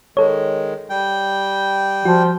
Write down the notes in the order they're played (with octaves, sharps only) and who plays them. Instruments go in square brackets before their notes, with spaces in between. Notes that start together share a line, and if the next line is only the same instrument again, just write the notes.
[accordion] D#3 G#3 [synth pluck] A4 C#5
[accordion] G3 G5
[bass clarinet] F3 [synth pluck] F#4